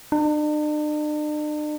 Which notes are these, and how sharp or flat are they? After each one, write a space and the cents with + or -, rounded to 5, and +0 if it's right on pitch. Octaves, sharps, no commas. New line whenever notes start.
D4 +45